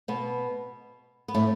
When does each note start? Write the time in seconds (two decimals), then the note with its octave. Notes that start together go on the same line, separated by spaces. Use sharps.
0.08 B2 B3
1.28 B3
1.34 A2 A3